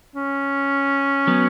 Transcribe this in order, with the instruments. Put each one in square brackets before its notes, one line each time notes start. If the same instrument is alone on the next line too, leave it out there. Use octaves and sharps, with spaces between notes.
[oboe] C#4
[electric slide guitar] F#3 B3